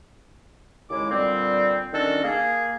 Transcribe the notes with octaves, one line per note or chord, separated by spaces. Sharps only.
D#2 C#3 G#3 E4 D6
A#2 D3 G3 C4
D#3 G3 C#4 D4 F#4 A4
A#3 G#4